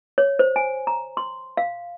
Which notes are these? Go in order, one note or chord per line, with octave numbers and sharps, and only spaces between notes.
C#5
C5
G#5
A#5
C6
F5